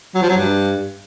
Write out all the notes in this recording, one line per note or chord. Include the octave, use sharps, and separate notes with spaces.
F#3
F3
F#3
G2